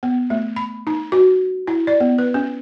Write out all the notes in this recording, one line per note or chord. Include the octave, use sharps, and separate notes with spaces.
B3
A3
B5
D#4
F#4
E4
D5
B3
B4
C#4